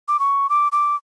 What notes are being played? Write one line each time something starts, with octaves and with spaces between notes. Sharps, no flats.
D6
C#6
D6
D6